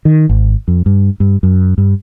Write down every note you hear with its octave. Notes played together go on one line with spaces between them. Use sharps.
D#3
G#1
F2
G2
G2
F#2
G2